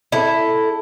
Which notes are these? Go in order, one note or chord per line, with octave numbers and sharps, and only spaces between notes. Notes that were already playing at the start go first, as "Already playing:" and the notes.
E4 A4